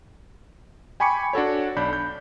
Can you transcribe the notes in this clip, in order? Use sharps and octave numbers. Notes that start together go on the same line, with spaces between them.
G5 G#5 B5 C#6 D6 C#7
D4 F#4 A4 C#5
B1 D4 B5 G6
G6